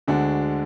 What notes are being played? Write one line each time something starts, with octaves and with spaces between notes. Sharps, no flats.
D2 D3 G#3 D4 F#4